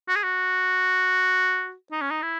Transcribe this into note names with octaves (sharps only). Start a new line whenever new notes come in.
F#4
G#4
F#4
D#4
C#4
D#4
E4